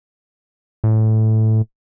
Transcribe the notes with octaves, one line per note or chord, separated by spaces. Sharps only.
A2